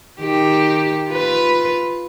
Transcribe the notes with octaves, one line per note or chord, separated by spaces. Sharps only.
D#3 G4
F4 B4